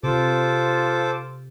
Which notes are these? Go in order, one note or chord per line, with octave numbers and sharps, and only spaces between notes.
C3 F4 A4 C5 D6